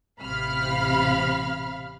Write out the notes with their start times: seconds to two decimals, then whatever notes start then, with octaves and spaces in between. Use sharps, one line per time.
0.21 A1 C3 F5 B5 F6